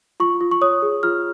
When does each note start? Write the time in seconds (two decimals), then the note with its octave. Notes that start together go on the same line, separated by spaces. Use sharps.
0.20 F4 C#6
0.41 F4
0.51 C#6
0.61 C#5 D#6
0.82 G#4
1.03 F4 F6